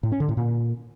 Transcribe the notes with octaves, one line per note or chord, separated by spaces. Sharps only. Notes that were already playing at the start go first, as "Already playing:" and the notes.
A2
C#4
D3
A2
A#2